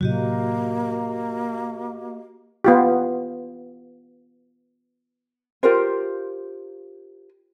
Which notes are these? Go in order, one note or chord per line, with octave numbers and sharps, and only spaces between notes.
A2 C3 F#3 A#3 F#4 G4 D#5
B3 F4 G4
F4 G4 A#4 C5